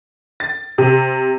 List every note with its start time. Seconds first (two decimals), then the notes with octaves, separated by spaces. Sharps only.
0.40 A6
0.78 C3